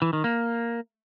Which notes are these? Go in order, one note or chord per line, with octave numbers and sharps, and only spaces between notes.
E3
D#3
A#3